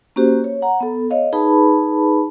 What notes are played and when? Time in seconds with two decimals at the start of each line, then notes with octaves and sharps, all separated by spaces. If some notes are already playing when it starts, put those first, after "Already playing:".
0.16 A#3 C#4 F#4 G4 C5
0.44 C#5
0.62 F#5 A#5
0.80 B3 A4
1.10 C#5 D#5 F5
1.33 D#4 G#4 B4 A5 B5